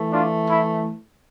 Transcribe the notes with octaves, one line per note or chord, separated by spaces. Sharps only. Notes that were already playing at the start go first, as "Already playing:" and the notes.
Already playing: E3 A3
D4 F4
E4